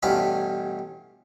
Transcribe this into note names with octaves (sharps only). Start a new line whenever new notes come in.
A1 G2 B2 C#4 F5 B5